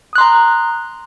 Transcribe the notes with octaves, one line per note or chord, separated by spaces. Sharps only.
A#5 C6 D#6 F#6